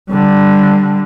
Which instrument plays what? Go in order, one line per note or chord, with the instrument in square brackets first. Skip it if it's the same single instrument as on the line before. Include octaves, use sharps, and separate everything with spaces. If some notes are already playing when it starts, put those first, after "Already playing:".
[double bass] D3 G3